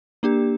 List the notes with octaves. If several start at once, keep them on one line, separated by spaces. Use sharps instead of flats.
A#3 D4 G4